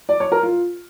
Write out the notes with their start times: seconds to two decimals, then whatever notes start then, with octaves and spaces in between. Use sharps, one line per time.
0.09 D5
0.20 C#5
0.32 A#4
0.43 F4